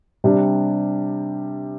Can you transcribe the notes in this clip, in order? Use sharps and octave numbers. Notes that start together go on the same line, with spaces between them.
C3 G3 D4